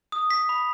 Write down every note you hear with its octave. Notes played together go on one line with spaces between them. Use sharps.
D#6
B6
B5